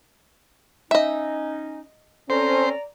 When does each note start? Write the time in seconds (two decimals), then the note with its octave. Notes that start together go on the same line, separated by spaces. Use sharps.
0.91 C#4 D#4 D#5 E5
2.30 C4 C#4 A4 C5 D5 A#5